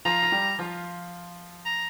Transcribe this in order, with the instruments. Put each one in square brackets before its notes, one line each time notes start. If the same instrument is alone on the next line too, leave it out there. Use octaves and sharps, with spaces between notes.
[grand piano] F3 F4 [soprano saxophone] A#5
[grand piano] F4
G3 G4
F3 F4
[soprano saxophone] A#5